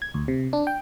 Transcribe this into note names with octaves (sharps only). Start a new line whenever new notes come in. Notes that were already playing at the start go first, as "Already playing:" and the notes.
G#6
D2
C3
D4
G5